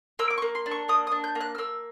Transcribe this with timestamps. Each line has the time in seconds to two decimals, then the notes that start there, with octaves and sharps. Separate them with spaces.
0.19 A#3 E6
0.30 D6
0.38 C#6
0.42 A#3
0.55 C6
0.66 D4
0.71 C#6
0.88 A#3 D#6
1.07 D#6
1.12 D4
1.24 G6
1.35 A#3
1.41 F#6
1.55 F6
1.58 A#3 E6